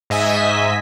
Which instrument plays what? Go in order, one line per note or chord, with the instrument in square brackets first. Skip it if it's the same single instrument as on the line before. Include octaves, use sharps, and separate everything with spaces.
[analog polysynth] G#2 D#5 E5 G#5 B6